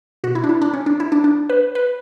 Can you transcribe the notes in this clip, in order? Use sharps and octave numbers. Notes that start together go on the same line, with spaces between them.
B2 F#4
E4
D4
E4
D4
C#4
D4
E4
D4
D4
B4
B4